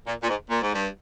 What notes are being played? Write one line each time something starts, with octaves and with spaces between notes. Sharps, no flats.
A#2
A#2
G#2
A#2
G#2
G2